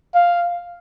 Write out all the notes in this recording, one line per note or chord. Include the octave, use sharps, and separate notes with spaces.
F5